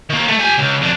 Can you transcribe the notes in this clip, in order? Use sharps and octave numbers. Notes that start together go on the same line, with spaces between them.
D#3 A#3
A3
G4 G#5
C#2
F2 D4